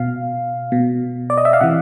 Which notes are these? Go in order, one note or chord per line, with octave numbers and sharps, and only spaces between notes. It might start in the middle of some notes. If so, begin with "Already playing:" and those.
Already playing: B2 F5
B2
D5
D#5
E5
F5
C3 E3 F#5